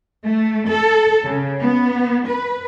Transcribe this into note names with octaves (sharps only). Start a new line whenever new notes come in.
A3
A4
C#3
B3
B4